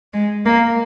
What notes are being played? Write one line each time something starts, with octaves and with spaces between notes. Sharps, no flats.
G#3
A#3